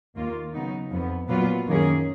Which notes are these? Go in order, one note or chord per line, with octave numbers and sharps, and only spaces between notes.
D#2 D#3 A#3 F4
C#3 F#3 B3 D#4
F2 F3 B3
A#2 F#3 B3 F4 B4
F#2 D#3 A#3 C#4 G#4